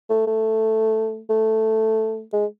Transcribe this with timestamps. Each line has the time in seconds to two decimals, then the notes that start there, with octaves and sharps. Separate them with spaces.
0.10 A3
0.27 A3
1.30 A3
2.33 G#3